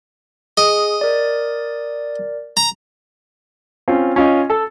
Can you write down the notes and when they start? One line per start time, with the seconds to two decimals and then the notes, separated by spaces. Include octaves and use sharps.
0.57 G#4 D#5
1.01 A#4 D5
2.57 A#5
3.88 C4 C#4 F4
4.16 C#4 F4 D#5
4.50 A4